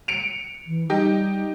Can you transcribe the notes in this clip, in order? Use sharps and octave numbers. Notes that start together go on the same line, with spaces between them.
C#7 D7 F7
E3
G3 D#4 G4